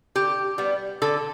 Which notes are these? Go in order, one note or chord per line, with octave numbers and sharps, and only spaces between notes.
D3 G4
G3 B3
D3 A4